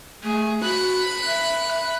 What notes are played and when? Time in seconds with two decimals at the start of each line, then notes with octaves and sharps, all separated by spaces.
0.24 A3 G#4
0.63 F#4 B5 F#6
1.26 E5